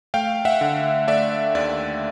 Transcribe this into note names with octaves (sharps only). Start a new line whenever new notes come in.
A3 F5 G5
E5 F#5
D3
A3 D5 E5
D#2 D5 E5